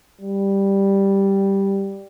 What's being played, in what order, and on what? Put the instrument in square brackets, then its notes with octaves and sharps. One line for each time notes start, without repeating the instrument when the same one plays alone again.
[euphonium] G3